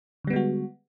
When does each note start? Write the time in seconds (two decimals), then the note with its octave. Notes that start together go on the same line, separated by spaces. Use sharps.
0.25 D3
0.27 G3
0.30 B3
0.33 G#3
0.36 F#4